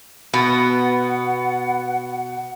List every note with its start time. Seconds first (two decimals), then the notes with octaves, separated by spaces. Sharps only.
0.34 B2 B3 F#5